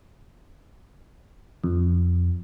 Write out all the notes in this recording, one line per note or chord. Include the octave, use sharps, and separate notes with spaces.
F2